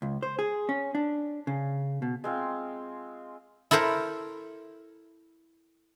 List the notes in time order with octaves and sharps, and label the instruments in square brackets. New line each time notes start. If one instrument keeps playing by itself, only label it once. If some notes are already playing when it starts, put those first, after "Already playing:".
[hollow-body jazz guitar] C#2
C5
G#4
C#4
D4
C#3
B2
[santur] G#3 C4 F4
[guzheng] E4 A4 A#4 C5 A#5